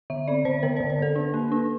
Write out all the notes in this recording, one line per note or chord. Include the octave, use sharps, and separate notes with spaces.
D3 E5
C4 D5
D3 C5
D3 A#4
D3 C5
C5
D3 A4
D4
A#3
D4